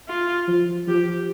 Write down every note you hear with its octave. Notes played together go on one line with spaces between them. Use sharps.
F4
F3
F3 G4